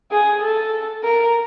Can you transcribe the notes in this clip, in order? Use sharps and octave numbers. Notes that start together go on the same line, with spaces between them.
G#4
A4
A#4